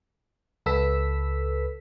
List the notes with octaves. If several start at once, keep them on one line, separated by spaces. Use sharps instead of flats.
C#2 A4 B4 E6 B6